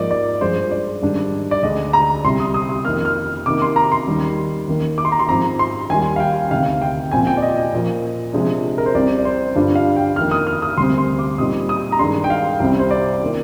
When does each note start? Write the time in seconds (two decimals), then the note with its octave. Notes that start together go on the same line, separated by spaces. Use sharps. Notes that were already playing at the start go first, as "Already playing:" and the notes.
Already playing: G#2 F3 A#3 D#4 D5
0.11 D5
0.41 G2 F3 G#3 C5
0.71 D5
1.02 G#2 D#3 G3 D4
1.51 D5
1.63 D2 D3 G#3 D4 D#5
1.93 A#5
2.24 C2 C3 G3 C6
2.40 D#6
2.54 D#6
2.69 D#6
2.85 F2 D#3 A#3 F6
3.05 F6
3.46 C3 D#3 A#3 D#4 D6
3.62 C6
3.76 A#5
3.92 C6
4.07 D#2 D#3 G3
4.68 D#2 D#3 A#3
4.98 D6
5.05 C6
5.12 A#5
5.19 C6
5.29 G#2 F3 C4 A#5
5.59 C6
5.90 D#2 D#3 G3 G#5
6.16 F5
6.20 G5
6.51 D2 C3 D#3 F5
6.82 G5
7.11 A#2 F3 C4 F4 G#5
7.27 G5
7.37 D5
7.42 D#5
7.57 D#5
7.73 A#2 F3 A#3
8.33 C3 F3 G#3 D4
8.78 A#4
8.86 C5
8.94 C2 C3 G3 C4 D5
9.19 D5
9.25 C5
9.55 G2 D3 G3 D4 F4
9.75 F5
9.96 G5
10.16 F2 D#3 A#3 F6
10.31 D#6
10.47 F6
10.62 D#6
10.77 D2 C3 G3 C4 C6
10.98 C6
11.19 D6
11.38 A#2 G3 C4 D#4 D#6
11.69 D#6
11.92 A#5
11.99 G2 D#3 G#3 D4 C6
12.24 G5
12.30 F5
12.60 C2 C3 G3 C4
12.79 C5
12.91 D5
13.23 D#3 A#3 F4